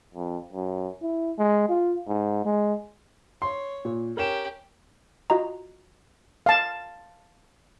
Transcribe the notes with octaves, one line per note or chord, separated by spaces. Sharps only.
F2
F#2
E4
G#3
F4
G#2
G#3
C#5 C6
A#2
C#4 G4 A#4 E7
F4 F#4 D#5 A#5
F5 A5